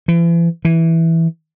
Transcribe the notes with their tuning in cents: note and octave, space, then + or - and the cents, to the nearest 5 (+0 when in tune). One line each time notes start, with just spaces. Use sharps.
E3 +40
E3 -5